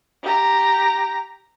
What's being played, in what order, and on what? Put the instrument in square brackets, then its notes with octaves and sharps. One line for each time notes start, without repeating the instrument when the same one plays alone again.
[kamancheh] G4 A#5